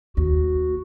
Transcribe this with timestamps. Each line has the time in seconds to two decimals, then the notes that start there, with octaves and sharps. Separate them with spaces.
0.17 D#2 F#4